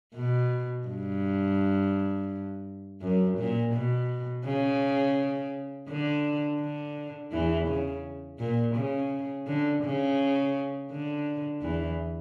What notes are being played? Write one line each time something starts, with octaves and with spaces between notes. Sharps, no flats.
B2
G2
F#2
A#2
B2
C#3
D3
D3
E2 E3
C#3
A#2
C#3
D3
C#3
D3
E2 E3